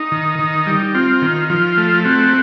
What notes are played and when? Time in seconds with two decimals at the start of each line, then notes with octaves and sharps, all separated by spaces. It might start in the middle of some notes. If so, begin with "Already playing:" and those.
Already playing: D#4
0.12 D#3
0.39 D#3
0.67 G3
0.94 C4 F4
1.22 D#3
1.50 F3 F4
1.78 A3
2.05 C4 F#4